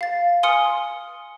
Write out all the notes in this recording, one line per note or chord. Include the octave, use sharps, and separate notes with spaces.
F5 A6
G#5 C6 D#6 F6 C#7